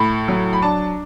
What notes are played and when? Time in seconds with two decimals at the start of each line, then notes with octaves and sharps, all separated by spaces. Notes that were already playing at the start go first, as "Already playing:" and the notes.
Already playing: A2 B5
0.28 F#3
0.53 B5
0.62 D4 A5